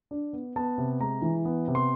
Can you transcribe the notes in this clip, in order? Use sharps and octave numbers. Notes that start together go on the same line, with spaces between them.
D4
B3
B3 A5
C3
G#3 A#5
E3
B3
C3
C6